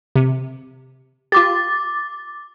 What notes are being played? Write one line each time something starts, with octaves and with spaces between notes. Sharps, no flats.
C3
F4 G4 D6 A6